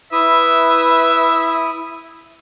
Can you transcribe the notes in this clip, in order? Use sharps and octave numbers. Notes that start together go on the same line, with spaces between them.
E4 B4 E5 D#6